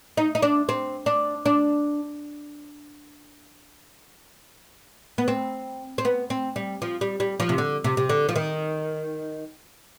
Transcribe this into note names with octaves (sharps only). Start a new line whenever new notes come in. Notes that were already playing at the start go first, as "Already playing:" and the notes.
D#4
D#4
D4
C4
D4
D4
B3
C4
C4
B3
C4
G3
F3
G3
G3
F3
C3
D3
C3
C3
D3
F3
D#3